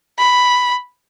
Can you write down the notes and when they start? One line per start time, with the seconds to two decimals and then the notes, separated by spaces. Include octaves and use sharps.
0.18 B5